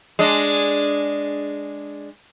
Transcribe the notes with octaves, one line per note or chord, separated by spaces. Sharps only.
G#3 D4